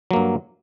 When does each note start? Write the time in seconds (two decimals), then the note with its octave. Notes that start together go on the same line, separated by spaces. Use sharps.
0.11 F#3
0.13 A#3
0.16 G2